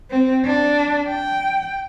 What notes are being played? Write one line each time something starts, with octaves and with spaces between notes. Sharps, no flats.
C4
D4
G5